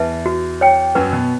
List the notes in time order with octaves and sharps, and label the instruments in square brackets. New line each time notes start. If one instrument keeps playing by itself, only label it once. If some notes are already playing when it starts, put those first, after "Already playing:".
Already playing: [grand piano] E2 E3 [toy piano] B4 E5 A5
[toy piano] F#4
C#5 G5
[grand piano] F#2 F#3 [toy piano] B4
[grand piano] B2 B3